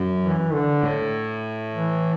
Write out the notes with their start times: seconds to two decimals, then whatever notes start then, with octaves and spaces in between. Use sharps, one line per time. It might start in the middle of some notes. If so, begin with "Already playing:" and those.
Already playing: F#2
0.23 E3
0.53 D3
0.83 A2
1.72 E3